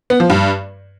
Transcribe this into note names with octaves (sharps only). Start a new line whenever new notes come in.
B3
F3
G2